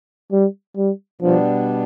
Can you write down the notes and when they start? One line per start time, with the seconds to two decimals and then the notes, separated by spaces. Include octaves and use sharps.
0.32 G3
0.77 G3
1.21 B2 F3 G3 B3 D4